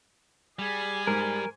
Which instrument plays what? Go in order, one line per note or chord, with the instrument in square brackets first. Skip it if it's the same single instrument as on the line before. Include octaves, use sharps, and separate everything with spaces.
[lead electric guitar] G3 [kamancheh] G#4 G#5
[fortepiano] G#2 [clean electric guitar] A#4